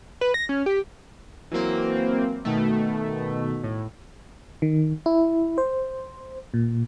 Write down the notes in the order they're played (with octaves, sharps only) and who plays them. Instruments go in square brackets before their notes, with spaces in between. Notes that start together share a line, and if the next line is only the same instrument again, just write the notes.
[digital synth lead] B4
A#6
C#4
G4
[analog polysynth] E3 F#3 A#3 C4
B2 D#3 A3
A2
[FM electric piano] D#3
E4
C5
A#2